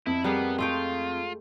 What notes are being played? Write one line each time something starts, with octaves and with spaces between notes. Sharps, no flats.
F2 E4
G3 A#3 B3 G#4
G#3 A3 F4 G5